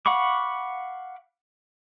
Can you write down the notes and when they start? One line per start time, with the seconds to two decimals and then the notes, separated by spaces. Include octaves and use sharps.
0.06 F5 F#5 B5 C#6 D6